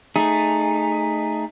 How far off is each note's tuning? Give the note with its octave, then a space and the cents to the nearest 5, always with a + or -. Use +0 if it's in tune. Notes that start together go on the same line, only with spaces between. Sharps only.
A3 +0 D#4 -10 G#4 +0